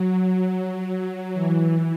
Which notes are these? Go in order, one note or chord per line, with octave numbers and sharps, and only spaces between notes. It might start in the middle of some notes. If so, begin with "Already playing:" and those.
Already playing: F#3
E3